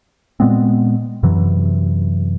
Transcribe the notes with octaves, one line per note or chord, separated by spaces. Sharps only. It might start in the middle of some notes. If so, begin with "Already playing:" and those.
A#2 G#3 B3 C4
F#2 C3 E3 F#3